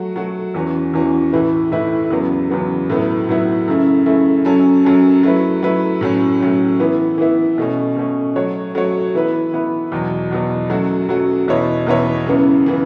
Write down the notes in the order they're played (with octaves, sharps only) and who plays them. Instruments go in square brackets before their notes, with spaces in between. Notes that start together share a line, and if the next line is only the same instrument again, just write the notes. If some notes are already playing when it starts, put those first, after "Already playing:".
Already playing: [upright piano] F#3 A3 F#4
F#3 A3 F#4
E2 E3 C#4 F#4
E2 E3 C#4 F#4
A2 E3 A3 E4 B4
A2 E3 A3 E4 B4
E2 C#3 F#3 B3
E2 C#3 F#3 B3
A2 F#3 B3 E4
A2 F#3 B3 E4
F#2 C#3 A3 E4
F#2 C#3 A3 E4
F#2 F#3 C#4 A4
F#2 F#3 C#4 A4
F#3 A3 E4 B4
F#3 A3 E4 B4
A2 F#3 C#4
A2 F#3 C#4
E3 B3 E4
E3 B3 E4
B2 A3 C#4
B2 A3 C#4
F#3 A3 F#4 C#5
F#3 A3 F#4 C#5
E3 B3 E4 B4
E3 B3 E4 B4
E2 B2 F#3
E2 B2 F#3
F#2 F#3 A3 F#4
F#2 F#3 A3 F#4
E2 B2 B3 E4 C#5
E2 B2 B3 E4 C#5
F#2 C#3 E3 B3
C#3 E3 B3